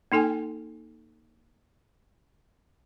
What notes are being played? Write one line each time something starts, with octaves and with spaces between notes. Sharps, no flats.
A#3 D#4 A4 G5 G#5